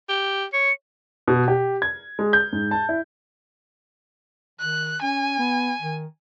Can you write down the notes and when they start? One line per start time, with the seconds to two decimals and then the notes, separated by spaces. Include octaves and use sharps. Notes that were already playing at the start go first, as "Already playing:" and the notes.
0.09 G4
0.53 C#5 C#7
1.28 B2
1.48 G4
1.82 G#6
2.19 G#3
2.33 G6
2.53 G#2
2.71 A5
2.89 E4
4.59 D#3 F#6
5.02 C#4 G#5
5.39 B3
5.80 D#3